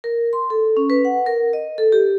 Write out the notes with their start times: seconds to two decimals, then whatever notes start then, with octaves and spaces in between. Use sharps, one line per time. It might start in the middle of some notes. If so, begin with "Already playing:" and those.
0.04 A#4
0.33 C6
0.50 A4
0.77 C#4
0.90 B4
1.05 F#5
1.26 A#4
1.53 D#5
1.78 A4
1.92 G4